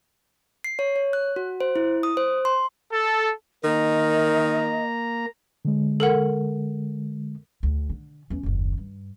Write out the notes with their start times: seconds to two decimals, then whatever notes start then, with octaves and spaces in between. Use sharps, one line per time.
0.64 C7
0.79 C#5
0.96 C#5
1.13 F#6
1.36 F#4
1.60 C5
1.76 E4
2.03 D#6
2.17 C5
2.45 C6
2.91 A4
3.64 D#3 A#3 D#5 A#5
5.65 D3 G#3
6.00 A4 A#4 F#5
7.63 D2
7.90 D3
8.30 E2 C#4
8.43 F#1 D#2
8.78 G2